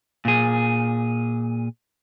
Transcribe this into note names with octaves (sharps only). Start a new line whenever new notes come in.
A#2 G#4